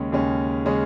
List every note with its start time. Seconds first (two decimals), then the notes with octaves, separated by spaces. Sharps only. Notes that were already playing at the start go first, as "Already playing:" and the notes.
Already playing: D#2 C#3 G#3 C#4
0.12 D#2 C#3 G#3 C#4
0.66 C#3 G#3 C#4